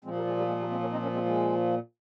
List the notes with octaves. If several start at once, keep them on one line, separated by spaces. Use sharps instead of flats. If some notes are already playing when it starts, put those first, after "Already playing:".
A#2 F3 G#3 C4
G3 A#3
G#3
G3 A#3
G#3
G3 A#3
G#3 C4
A#3 C#4
C4 D#4
A#3 C#4
G#3 C4
G#3